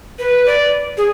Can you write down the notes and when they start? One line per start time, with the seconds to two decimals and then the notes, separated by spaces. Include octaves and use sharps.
0.19 B4
0.46 D5
0.97 G#4